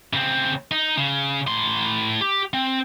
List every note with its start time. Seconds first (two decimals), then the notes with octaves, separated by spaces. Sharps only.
0.13 C#3 C4
0.71 D#4
0.98 C#3
1.47 A2 C6
2.21 G4
2.53 C4